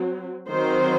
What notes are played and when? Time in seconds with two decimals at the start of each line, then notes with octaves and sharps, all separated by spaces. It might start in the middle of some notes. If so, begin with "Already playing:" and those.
Already playing: F#3 C4
0.49 D#3 F#3 C4 C5